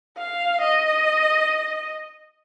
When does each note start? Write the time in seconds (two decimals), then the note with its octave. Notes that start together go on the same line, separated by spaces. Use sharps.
0.18 F5
0.62 D#5